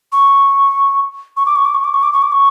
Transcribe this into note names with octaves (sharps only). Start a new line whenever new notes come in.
C#6
C#6
D6
C#6
D6
C#6
D6
C#6
D6
C#6
D6
C#6